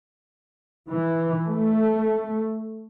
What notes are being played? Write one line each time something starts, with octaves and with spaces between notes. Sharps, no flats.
E3
A3